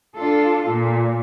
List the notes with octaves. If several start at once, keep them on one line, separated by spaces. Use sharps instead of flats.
D4 F4 A4
A#2